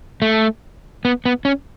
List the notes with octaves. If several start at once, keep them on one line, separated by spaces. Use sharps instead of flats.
A3
B3
B3
C#4